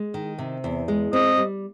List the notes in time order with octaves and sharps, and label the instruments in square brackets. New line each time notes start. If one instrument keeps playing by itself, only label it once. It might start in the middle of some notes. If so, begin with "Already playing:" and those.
Already playing: [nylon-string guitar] G#3
D#3
C3
E2
G#3
[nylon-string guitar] C4 [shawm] D#5
[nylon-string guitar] G3